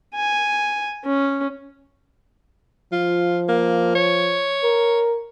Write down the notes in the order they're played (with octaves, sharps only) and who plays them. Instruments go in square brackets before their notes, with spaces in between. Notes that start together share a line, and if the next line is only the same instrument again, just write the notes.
[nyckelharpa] G#5
C#4
[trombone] F3 [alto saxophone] F4
[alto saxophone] A#3
C#5
[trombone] A#4